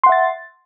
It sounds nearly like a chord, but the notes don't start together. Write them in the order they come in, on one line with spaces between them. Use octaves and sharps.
C6 F#5 E5 A6